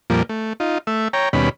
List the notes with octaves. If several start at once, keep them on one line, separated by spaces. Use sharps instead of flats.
F2 A#2 F3 G3 A#3
A3
D#4 F4
A3 E5
C#5 G5 A#5
D#2 B2 G3 C#4 B5